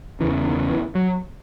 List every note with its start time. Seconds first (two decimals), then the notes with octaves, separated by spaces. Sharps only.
0.20 C#3 E3
0.24 E2
0.46 D#3
0.70 E3
0.95 F#3